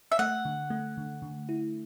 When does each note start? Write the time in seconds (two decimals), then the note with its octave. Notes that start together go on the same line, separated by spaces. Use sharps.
0.12 E5
0.19 A3 F#5
0.45 D3
0.70 A3
0.97 D3
1.22 D3
1.49 E4